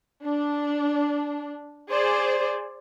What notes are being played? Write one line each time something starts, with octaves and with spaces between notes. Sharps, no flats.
D4
G#4 C5 D5